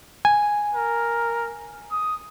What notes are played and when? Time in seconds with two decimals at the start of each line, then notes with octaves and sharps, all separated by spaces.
0.25 G#5
0.75 A#4
1.92 D#6